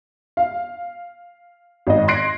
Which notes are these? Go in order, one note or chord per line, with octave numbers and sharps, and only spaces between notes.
F5
G#1 D#5
C6 F#6 G#6 A#6 C7 D7